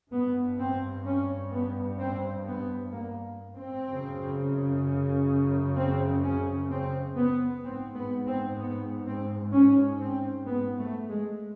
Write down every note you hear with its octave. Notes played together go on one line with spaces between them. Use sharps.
G2 B3
C4
C#4
B3
C4
B3
A#3
C4
F#2 C#3
C4
C#4
C4
B3
G#2 C4
B3
C4
B3
C4
C#4
C4
B3
A3
G#3